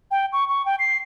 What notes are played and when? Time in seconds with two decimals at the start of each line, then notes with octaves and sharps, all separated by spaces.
0.11 G5
0.33 C#6
0.49 C#6
0.66 G5
0.79 C7